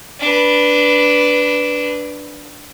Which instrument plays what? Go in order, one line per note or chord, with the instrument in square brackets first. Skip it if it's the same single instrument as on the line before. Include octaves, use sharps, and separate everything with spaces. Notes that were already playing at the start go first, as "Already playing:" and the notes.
[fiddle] D4 B4